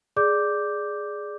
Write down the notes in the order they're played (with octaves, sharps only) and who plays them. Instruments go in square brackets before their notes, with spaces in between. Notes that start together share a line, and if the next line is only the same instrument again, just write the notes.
[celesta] G#4 D5 D6 G6